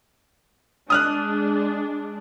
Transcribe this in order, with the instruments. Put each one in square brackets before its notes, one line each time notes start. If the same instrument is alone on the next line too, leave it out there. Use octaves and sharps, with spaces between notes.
[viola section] G#3 D4 [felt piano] D#6 F6 F#6